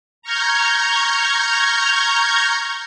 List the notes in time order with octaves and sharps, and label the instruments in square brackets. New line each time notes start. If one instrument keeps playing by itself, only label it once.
[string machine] A#5 C#6 F6 G6 G#6